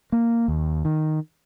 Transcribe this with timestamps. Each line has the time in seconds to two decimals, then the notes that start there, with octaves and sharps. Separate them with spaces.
0.12 A#3
0.48 D#2
0.85 D#3